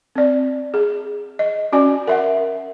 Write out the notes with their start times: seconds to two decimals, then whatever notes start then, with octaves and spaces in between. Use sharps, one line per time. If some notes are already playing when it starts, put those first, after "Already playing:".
0.16 C4 D5
0.74 G#4
1.39 D#5
1.72 C#4 F#4 D5 G#5
2.08 A#4 E5 F#5